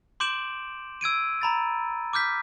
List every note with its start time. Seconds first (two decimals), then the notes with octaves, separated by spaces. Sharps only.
0.20 C6 D6 G6 D7 E7 F#7
1.01 E6 G#6 D7 D#7
1.41 A#5 B5 A6
2.13 D6 F6 G6 B6